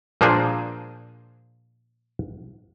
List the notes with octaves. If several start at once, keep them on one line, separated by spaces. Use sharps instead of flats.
A#2 F3 A#3 D4 G#4 C5